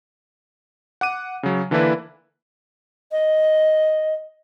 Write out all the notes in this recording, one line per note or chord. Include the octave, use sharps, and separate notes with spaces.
F#5 D6 D#7
C#3 F#3
D3 E3 A#3 D4 E4 B4
D#5